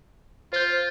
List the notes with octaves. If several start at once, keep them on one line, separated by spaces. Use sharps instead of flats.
F4 C5 G6